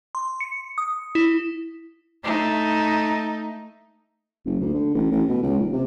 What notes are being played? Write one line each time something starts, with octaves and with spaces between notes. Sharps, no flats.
C6
C#7
D#6
E4
A3 D#4
F#1
D2
D3
A1
A1
B2
C#2
D#1
C3